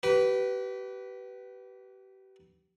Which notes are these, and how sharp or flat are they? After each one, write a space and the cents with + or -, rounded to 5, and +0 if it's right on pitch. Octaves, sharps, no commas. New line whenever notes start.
G4 -35 B4 +0